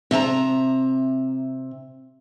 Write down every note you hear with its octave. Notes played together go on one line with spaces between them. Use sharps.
C3 E5 A5 A#5